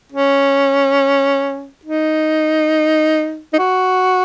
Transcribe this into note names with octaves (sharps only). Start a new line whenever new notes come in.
C#4
D#4
D#4
F#4